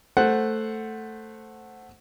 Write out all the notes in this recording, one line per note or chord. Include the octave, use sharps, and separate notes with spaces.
A3 C5 F#5